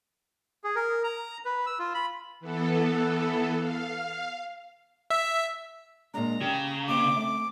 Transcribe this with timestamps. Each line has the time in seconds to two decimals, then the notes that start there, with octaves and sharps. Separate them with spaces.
0.64 G#4
0.76 A#4
1.04 A#5
1.45 B4
1.66 E6
1.79 F4
1.94 B5
2.40 E3 B3 A4
3.60 F5
5.10 E5
6.14 A#2 G#3 D4 A#5
6.41 C#3 G4
6.88 D#2 C3 C5 D6
7.16 A3 C4 E5